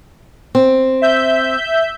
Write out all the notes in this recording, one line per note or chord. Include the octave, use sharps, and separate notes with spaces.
C4
E5 G6